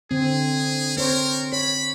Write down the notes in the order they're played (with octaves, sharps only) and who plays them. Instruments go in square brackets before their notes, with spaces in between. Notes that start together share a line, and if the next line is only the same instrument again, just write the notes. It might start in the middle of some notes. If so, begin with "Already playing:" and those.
[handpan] D3 C4 [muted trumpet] G#4
[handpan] C4 C5 C#5 [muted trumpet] A#4
[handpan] C#5 [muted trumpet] B5